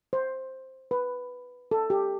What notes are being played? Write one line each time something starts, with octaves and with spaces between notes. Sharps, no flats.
C5
B4
A4
G4